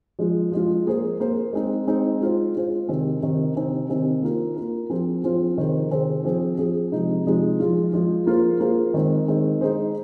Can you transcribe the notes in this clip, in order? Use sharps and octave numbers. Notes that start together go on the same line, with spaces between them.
F3 G#3 F4
F3 G#3 F4
A#3 G#4 C5
A#3 G#4 C5
G#3 C4 D#4
G#3 C4 D#4
G#3 F4 C5
G#3 F4 C5
C3 D#3 C4
C3 D#3 C4
C3 D#3 C4 D#4
C3 D#3 C4 D#4
A#3 F4 A#4
A#3 F4 A#4
F3 C4 F4 G#4 C5
F3 C4 F4 G#4 C5
C3 D#3 C4 G#4 C5
C3 D#3 C4 G#4 C5
F3 C4 G#4
F3 C4 G#4
C3 F3 G#3 D#4
C3 F3 G#3 D#4
F3 G#3 F4
F3 G#3 F4
A#3 F4 G#4 C5
A#3 F4 G#4 C5
D#3 G#3 C4
D#3 G#3 C4
G#3 D#4 G#4 C5